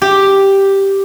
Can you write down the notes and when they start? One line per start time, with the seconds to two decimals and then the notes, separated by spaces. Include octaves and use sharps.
0.02 G4